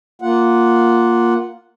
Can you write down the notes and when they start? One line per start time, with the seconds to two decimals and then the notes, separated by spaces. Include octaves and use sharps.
0.22 A#3 F4 F#5